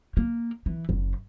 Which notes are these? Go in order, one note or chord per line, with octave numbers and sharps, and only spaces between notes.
A#3
E3
F#1